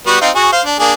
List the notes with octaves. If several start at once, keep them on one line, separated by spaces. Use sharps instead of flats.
G3 B3 F#4
C4 D#4 F4
F#4 G#4
C5 F5
D4
A#3 D4 G#4